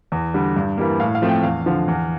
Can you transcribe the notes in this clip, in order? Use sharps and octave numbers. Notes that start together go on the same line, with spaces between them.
E2
D3 G3
G2
E3 G3 A#3
A2 F5
F5
F3 A3 C4
G5
E2 F5
D3 F3
E2